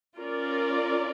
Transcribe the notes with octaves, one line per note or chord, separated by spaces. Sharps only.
C#4 F4 A#4 D5